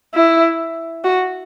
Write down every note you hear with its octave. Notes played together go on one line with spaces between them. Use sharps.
E4
F#4